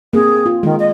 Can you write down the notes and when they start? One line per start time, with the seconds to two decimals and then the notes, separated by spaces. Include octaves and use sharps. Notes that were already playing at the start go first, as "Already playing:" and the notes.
0.13 A#3 C4 G#4
0.46 F4
0.63 D#3 G#3
0.79 D#5